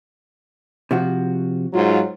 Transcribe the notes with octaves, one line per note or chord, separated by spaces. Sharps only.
C3 F3 F#4
G#2 F#3 F4